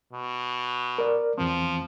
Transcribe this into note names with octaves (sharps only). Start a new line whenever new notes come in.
B2
A#4 D5
E2 E3 F3 C4